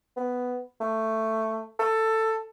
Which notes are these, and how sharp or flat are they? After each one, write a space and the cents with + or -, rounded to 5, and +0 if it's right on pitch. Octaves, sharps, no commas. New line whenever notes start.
B3 +5
A3 +10
A4 +15